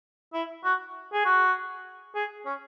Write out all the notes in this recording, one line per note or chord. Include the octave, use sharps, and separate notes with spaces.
E4
F#4
G#4
F#4
G#4
C#4